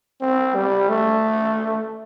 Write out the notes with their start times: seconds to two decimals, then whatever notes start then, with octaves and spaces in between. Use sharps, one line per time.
0.21 C4
0.55 G3
0.89 A3